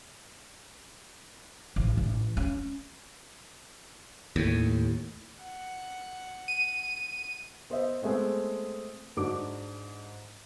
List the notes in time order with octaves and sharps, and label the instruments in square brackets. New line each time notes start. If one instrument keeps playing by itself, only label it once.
[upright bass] A1
A1
C#4
[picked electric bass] D#2 A2
[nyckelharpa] F#5
[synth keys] D#7
[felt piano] B3 C5 D#5 E5
G#3 A3 B3 C4
G#2 D4 F#4 D6